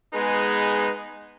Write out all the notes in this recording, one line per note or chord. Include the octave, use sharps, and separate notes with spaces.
G#3 B3 D#4 G#4 B4